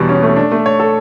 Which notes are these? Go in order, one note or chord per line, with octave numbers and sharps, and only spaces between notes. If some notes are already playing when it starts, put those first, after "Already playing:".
Already playing: E2 B2 G3
C#4
A3
D4
A3
C#5
A4